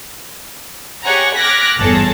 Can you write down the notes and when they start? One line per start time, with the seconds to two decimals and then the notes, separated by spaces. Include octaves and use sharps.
1.03 G4 G#4 C#5 F#5 G#5 A#5
1.36 D6 F6 F#6 G#6 A#6 B6
1.79 G1 E2 G#4 A4 C#5 A5